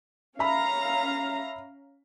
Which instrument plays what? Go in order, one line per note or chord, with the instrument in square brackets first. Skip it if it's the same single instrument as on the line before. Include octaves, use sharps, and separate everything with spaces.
[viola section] C#4 F5 A#5 [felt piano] E5 B5